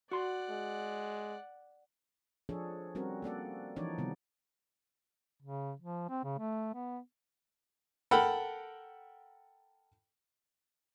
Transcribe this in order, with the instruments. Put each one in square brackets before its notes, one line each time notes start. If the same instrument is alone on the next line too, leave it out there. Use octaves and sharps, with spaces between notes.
[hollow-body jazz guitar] F#4 C6 [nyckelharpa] D5 F#5
[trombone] G#3
[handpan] F3 D4 G#4 A4 C#5
G3 C4 C#4 F#4 A#4
A#3 A4 D5 F#5
E3 F3 D4 D#4 C#5 D5
C3 D#3 G3 B3
[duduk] C#3
F3
C4
C#3
A3
B3
[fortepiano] A4 A#4 F#5 G5 B5